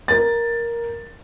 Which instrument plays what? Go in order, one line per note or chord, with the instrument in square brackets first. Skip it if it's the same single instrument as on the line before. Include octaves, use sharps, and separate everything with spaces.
[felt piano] A#4 A6